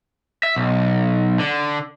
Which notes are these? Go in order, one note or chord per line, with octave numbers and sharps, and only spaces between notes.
E5
B1
D3